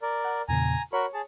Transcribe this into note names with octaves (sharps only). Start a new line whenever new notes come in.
A#4 D5
F#5
E2 A#2 C#3 G#5 A#5
F#4 A#4 C#5 B5
G#4 A5